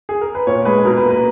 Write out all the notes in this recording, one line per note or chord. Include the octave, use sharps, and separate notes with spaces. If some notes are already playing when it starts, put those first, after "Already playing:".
G#4
A#4
B4
A#2 C#5
G#3 B4
B2 A#4
B4
A#3
B4